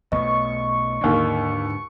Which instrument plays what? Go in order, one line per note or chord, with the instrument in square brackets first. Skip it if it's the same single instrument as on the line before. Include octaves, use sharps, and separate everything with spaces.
[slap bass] B1 B2 A3 [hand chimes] D#5 [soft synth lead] C#6
[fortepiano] D#2 A#3 [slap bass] G#2 D3 D4